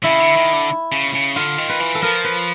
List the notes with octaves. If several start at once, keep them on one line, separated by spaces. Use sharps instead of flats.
C#3 E4
D3
D#3
D3
C#3
C#3
D3 F4
D#3
B4
E3
A4
F3 A#4
B4